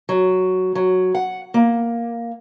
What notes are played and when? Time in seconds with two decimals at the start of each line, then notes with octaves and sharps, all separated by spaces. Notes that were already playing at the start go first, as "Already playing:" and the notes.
0.09 F#3
0.75 F#3
1.15 F#5
1.54 A#3